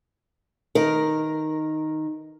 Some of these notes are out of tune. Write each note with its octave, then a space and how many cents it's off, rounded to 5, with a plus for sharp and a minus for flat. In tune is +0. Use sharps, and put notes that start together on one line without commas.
D#3 +0 A#4 +0